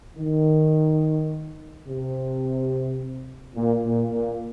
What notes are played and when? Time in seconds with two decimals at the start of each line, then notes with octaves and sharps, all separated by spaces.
0.17 D#3
1.86 C3
3.55 A#2
3.84 A#2
4.12 A#2